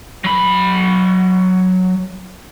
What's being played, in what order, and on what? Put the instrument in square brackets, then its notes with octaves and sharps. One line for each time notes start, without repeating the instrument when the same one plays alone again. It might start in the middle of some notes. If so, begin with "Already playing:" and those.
[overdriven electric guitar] F#3 B5